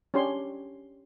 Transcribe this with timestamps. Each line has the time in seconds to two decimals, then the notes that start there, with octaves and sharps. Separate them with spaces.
0.14 C#4 D4 G4 C#5 C6